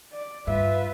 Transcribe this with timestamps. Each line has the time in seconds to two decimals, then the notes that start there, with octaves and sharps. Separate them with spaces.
0.12 D5
0.47 G2 F4 B4 E5